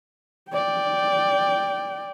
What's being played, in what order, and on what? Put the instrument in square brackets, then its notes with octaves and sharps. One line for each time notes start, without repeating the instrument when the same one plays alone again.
[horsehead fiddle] D5 G5